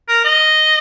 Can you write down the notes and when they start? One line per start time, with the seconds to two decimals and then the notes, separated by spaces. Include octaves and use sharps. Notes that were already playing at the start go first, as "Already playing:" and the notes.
0.08 A#4
0.25 D#5